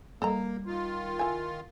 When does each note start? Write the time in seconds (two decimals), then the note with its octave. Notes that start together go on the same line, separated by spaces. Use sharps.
0.22 G3 A#3 A4 D#5 A#5
0.66 D#3 F4
1.19 E4 G#5